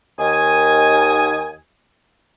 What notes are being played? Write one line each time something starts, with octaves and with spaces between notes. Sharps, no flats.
D#2 D#3 G#5 D#6